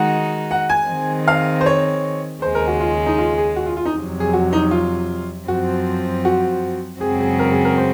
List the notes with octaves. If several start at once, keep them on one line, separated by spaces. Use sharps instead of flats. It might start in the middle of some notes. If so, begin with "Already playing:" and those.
Already playing: D#3 G#3 D#4 F#4 F#5
F#5
G#5
D#3 G#3 C4
F5
C5
C#5
D#2 C#3 G#3 C5
A#4
F#4
F4
D#4
F4
G#4
F#4
F4
F4
D#4
F2 C3 F#3
G#4
F#4
D#4
F4
F#2 F3 C4 F#4
F#4
F#2 C#3 G#3 C4 F#4 G#4
G#4
A#4
G#4
A#4
C5